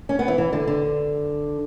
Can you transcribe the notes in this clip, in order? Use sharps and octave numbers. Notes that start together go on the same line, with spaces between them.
C#4
B3
E3
E3
D3
D3